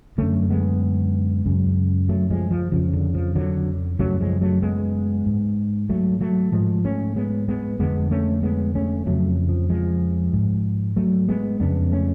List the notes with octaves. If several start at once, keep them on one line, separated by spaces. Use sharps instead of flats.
F#2 D3 A3 C#4
G#3 B3
F#2 C#3
F#3 A3
F3 G#3
F3
F2 C#3 F3
D3
F3
D3 F#3
F#2 C#3 F#3 A3
F3 G#3
F#3 A3
G#3 B3
G#2
F#3 A3
F#3 A3
G#2 F3 G#3
A3 C#4
G#3 B3
G#3 B3
F2 D3 G#3 B3
A3 C#4
G#3 B3
A3 C#4
F2 C#3 F#3 A3
F3
F3 G#3
G#2
F#3 A3
G#3 B3
F2 C#3 B3 D4
A3 C#4